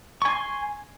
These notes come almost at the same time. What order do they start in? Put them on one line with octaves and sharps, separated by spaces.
C#6 G#5 C6